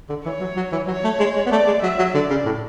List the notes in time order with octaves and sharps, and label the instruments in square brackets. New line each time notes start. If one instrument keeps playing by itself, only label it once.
[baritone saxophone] D3
[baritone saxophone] E3 [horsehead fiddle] C#5
[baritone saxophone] F#3
F#3
E3
[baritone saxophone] F#3 [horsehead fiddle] C#5
[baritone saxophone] A3
G#3
G#3
B3
[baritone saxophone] A3 [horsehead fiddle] D5
[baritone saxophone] G#3
[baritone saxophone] F#3 [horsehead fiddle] E5
[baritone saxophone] F#3
[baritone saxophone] D3 [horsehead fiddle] D5
[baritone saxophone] C#3
A2